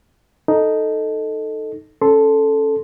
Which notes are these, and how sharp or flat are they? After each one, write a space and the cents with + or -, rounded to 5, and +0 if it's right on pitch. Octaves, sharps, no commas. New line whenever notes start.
D#4 +0 A4 +0
C#4 +0 A4 -5 C6 +0